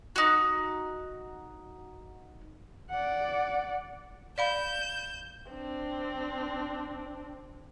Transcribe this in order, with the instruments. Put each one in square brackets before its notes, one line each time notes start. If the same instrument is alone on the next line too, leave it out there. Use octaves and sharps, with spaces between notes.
[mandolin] D#4 F#4
[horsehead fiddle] D5 F#5
[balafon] D5 F5 B5 [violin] G6 E7
[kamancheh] C4 D4